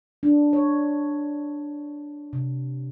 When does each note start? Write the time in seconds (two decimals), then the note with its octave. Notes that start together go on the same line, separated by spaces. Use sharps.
0.23 D4
0.53 C#5
2.33 C3